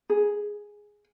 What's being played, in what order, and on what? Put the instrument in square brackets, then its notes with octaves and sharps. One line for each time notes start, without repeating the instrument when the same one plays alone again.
[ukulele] G#4